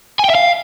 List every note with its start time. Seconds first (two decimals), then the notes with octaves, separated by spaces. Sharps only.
0.19 G#5
0.25 G5
0.30 E5
0.35 F5